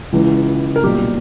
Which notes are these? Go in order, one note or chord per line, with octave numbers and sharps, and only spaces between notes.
C#2 C#3 E3
A#4
B1 A#2 G3 G4